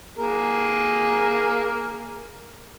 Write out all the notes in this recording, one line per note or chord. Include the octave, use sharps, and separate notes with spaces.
A#3 G#4 A#4